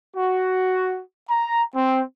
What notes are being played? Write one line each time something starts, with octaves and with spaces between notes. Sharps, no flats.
F#4
A#5
C4